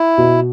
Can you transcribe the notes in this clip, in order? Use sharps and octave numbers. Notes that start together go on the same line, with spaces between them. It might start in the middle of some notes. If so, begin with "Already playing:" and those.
Already playing: E4
B2